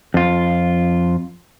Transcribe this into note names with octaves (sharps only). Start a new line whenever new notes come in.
F2 F4